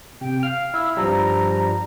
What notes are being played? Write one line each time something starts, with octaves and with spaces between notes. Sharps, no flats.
C3 G5
F5 F6
E4 E6
G2 F3 G3 A#5